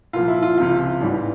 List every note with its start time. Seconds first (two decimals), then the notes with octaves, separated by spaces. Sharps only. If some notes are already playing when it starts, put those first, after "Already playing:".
0.13 C2 A#2 F3 F4
0.28 E4
0.42 F4
0.58 C#2 C3 F3 F4
1.01 A1 G#2 E3 G3